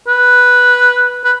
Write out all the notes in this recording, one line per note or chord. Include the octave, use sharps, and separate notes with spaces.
B4
B4